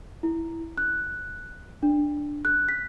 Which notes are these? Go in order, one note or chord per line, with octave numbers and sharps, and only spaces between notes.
E4
F#6
D4
F#6
B6